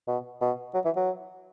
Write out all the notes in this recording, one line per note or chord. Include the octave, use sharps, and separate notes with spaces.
B2
B2
F#3
E3
F#3